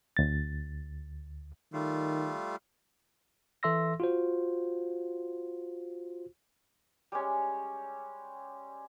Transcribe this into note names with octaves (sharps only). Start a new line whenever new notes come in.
D2 A6
D#3 G3 A3 F4
E3 A4 E5 C6 E6 A#6
F4 F#4 C5
G3 G#3 C#4